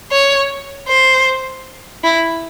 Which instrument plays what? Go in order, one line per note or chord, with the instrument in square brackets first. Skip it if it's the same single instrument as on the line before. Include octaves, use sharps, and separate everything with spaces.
[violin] C#5
C5
E4